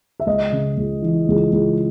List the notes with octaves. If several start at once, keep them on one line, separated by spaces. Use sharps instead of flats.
E5
C#2 D#5
C#3
C#2
E3
C#2
C#2